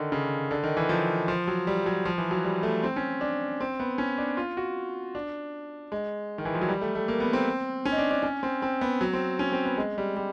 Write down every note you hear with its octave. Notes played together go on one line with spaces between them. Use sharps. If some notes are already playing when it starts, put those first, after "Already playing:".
Already playing: D3 D#3
C#3
D3
D#3
E3
F3
F3
F#3
G3
F#3
F3
E3
F#3
G3
A3
C4
C#4
D4
C4
B3
C#4
D4
F4
F#4
D4
G#3
D#3
E3
F3
F#3
G3
A3
A3
A#3
B3
C4
C#4
D#4
D4
D4
C#4
C4
C4
B3
F#3
C4
C#4
C4
B3
G#3
G3
G3